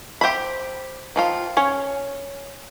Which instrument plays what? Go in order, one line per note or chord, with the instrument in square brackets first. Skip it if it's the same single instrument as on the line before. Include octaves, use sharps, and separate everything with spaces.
[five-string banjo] G4 C5 E5 B5
D#3 F3 F4
C#4 C#5